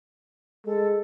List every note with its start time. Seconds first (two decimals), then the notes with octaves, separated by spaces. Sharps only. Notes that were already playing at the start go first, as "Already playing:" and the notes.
0.65 G#3 A4